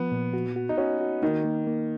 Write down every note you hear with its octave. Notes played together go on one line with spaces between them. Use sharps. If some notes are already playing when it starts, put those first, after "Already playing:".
Already playing: F3 B3
A#2
F#4
F#4
D#4
C#4 F#4
F#4
D#3 A#3
A#3
A#3